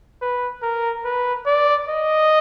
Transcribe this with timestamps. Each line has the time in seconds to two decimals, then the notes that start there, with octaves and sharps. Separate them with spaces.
0.22 B4
0.63 A#4
1.05 B4
1.46 D5
1.89 D#5